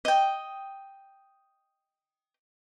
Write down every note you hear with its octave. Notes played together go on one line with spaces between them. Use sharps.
D#5 G5